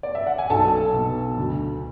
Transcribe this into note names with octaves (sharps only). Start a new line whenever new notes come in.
D5
E5
F#5
G#5
B1 A4 A5
B2
D2